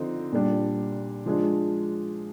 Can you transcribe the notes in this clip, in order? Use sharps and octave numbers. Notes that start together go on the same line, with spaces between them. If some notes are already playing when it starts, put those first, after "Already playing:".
Already playing: D3 F3 C4 D#4
A#2 G3 D4
F3 G#3 D4